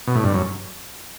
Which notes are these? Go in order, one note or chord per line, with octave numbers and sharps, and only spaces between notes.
B2
A2
G2
F#2